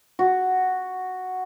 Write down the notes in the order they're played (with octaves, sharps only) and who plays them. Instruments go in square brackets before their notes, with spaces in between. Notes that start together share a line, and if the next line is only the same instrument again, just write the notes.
[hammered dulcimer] F#4